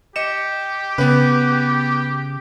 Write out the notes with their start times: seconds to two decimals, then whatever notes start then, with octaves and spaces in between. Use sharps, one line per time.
0.16 G4 D#5 C#7 E7
0.98 C#3 B3 B4